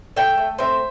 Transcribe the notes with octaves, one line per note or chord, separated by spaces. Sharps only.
A3 E5 G5
A3
C4 C5 E5